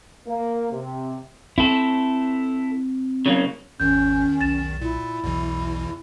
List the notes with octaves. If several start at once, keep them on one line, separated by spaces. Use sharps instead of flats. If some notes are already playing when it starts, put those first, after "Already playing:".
A#3
C3
C4 E4 A4
C#3 F#3 A#3
G#1 E2 D#3 C#4 G6
B1 A6 E7
A#2 E4
B1 E2 B2 E3